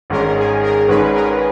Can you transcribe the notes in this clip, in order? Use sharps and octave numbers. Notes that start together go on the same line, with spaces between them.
G#1 G#2 D#3 G#3 C#4 A#4
G#4
A#4
G#1 G#2 D#3 G#3 C#4 B4
A#4